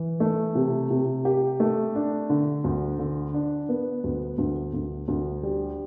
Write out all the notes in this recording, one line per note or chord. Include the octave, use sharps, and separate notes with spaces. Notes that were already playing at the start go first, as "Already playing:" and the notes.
Already playing: E3
A3
C3
C3
G4
A3
D4
D3
D2
D3
D4
B3
D2
D2
D2
D2
G3